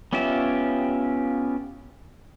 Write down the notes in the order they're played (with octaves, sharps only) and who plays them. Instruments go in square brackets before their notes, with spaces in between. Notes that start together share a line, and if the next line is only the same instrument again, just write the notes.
[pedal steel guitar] B3 C#4 F4 G4 E5